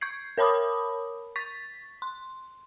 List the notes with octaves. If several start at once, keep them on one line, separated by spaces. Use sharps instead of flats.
C#6 G6 G#6 C7
A#4 C#5 A5 B5 D6 D#6
C#6 A6 B6
C6